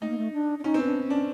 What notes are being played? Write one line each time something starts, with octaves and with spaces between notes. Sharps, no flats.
A3 D#4
A#3
A3
D4
D4
C#4 D#4
C4
B3
D4
C#4 D4